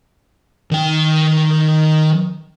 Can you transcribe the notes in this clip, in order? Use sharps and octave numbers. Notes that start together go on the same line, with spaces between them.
D#3 G5